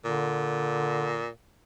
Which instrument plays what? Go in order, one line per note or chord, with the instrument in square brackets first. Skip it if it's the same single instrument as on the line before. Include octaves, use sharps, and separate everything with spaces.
[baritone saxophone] A#2 [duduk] D3